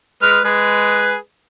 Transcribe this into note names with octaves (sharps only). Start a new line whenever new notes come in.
G#3 B4 F6
G#3 G#4 B4